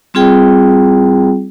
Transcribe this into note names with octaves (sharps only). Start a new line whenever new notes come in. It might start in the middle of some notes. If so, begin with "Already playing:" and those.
G3 C4 F4 G#4 G5